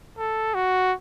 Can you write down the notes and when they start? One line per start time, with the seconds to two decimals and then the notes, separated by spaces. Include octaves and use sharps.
0.18 A4
0.55 F#4